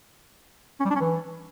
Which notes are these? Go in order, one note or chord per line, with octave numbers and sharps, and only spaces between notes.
C#4
G3
D4
C#4
E3